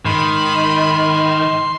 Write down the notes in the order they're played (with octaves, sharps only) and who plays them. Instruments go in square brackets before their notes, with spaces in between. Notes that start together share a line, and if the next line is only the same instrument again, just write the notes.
[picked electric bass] G#2 [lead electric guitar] D#3 [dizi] B5 [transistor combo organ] C6